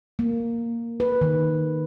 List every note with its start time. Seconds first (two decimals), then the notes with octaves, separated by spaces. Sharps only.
0.19 A#3
1.00 B4
1.21 D#3